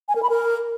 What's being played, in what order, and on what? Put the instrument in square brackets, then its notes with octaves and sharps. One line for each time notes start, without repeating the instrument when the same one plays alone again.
[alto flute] G#5
A#4
B5
A#4